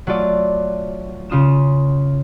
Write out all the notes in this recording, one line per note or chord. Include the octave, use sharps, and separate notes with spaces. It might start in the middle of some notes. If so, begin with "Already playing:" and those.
F#3 A3 F4 D5
C#3 F4 D#6 E7